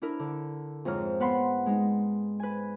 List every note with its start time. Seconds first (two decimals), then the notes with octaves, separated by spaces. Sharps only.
0.02 D4 E4 A#4
0.20 D3
0.85 F2 G#2 C#5 A#5 F6
1.20 B3 B4 F#5 B5 C6
1.66 G#3 D#4
2.40 B4 G#5